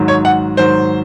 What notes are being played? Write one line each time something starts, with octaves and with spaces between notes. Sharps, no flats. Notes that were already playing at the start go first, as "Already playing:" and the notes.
Already playing: G#2 D#3 F#3
C#5
F#5
G#2 D#3 F#3 C5